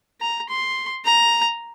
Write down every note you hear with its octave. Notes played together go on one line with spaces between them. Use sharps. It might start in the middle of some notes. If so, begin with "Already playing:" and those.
A#5
C6
A#5